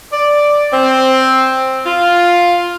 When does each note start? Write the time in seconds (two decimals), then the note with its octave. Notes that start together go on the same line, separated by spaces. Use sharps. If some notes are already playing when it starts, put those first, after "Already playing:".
0.12 D5
0.73 C4
1.86 F4